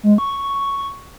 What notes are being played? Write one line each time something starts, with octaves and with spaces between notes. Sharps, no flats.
G#3
C#6